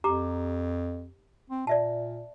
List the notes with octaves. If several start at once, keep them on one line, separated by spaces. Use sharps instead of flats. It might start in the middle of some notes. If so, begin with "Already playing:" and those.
F2 G4 A#5 D6
C4
A#2 D5 E5 A5